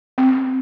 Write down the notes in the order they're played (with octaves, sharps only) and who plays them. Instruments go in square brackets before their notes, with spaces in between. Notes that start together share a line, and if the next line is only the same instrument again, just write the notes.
[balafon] C4